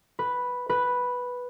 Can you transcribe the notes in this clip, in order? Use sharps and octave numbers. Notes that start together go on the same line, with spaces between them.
B4
B4